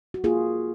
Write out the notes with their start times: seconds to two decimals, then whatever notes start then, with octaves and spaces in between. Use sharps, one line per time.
0.14 F#4
0.24 A#3 F4 G#4